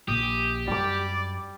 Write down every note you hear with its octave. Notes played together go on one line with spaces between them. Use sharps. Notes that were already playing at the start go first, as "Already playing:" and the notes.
A#1 G4 D#6
F#2 G3 D5 D6